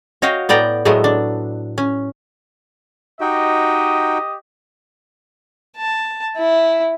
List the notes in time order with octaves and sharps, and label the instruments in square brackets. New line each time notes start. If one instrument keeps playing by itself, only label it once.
[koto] F#4 C#5 D#5 F5 G5
A2 B3 D5 G5 A#5
A2 F#3 G#3 A3 B3
D4
C#4
[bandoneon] D#4 F#4 G5 [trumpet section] G4 D#5
[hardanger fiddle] A5
E4